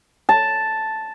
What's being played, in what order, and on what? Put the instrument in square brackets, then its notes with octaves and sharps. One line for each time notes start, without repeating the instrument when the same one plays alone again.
[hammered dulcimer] A5